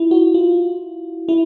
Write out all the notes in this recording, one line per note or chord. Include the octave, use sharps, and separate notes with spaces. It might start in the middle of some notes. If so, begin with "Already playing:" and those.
Already playing: E4 F4
F#4
F4
E4